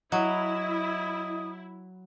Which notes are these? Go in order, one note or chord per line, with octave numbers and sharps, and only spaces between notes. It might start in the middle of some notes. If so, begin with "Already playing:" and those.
F#3 E4 D#5 D#6